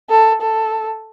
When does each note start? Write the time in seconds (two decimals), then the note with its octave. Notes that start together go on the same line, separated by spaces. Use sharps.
0.10 A4
0.42 A4